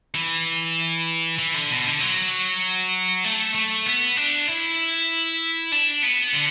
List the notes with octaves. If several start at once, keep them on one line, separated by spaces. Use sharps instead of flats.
E3
E3
D3
B2
D3
F#3
A3
A3
B3
D4
E4
D4
B3
D3